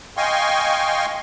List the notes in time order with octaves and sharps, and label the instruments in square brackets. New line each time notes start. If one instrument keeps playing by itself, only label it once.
[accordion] D#5 F5 G5 G#5 C6 C#6